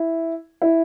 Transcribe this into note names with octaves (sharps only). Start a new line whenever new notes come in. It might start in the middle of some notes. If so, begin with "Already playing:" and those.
Already playing: E4
E4